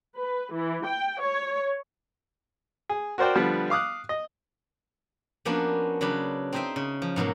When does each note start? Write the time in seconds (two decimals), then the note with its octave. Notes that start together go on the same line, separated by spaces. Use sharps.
0.17 B4
0.54 E3
0.86 G5
1.22 C#5
2.89 G#4
3.18 F#4 A#4 C5 D5 G5
3.35 D3 F3 G3 B3
3.70 F5 D6 D#6 F#6
4.09 D#5
5.45 F3 A#3 B3 C#4 D4 F#4
6.01 C#3 F#3 D4 B4
6.53 C4 D#4 C5 D#5 E5 G5
6.76 C#3
7.02 F3
7.16 G#2 B2 F#3 A#3